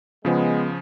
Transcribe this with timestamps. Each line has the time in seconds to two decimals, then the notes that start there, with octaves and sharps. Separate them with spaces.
0.25 C#3 F3 G#3 B3